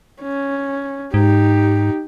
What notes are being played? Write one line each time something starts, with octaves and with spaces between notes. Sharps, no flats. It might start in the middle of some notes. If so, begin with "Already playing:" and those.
C#4
G#2 D#4 G4